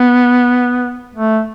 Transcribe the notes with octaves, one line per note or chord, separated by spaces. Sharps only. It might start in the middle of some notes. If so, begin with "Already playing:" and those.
Already playing: B3
A3